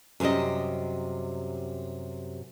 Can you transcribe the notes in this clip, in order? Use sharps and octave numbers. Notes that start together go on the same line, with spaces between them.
F#2 C3 G3 G4 D#5